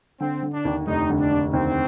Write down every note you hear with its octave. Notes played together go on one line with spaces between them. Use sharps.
D3 C4
D3
D4
D#2
F1 D#4
D3
D4
D3
D#2 C4